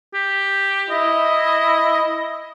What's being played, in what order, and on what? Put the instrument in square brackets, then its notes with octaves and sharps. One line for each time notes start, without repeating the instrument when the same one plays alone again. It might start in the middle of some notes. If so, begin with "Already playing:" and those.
[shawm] G4
[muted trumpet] E4 [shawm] D#5